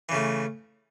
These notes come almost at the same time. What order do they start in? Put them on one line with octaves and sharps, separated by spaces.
E3 C#3 A3